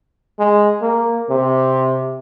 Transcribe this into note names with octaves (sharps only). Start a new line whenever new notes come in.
G#3
A#3
C3